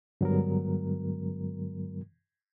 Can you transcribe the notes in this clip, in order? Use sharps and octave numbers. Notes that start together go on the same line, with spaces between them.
G2 D3 F#3 G#3 B3 A#4